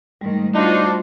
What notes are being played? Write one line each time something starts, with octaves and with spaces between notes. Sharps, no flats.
G#2 D#3 G3 A3
D4 D#4 F4 F#4 C5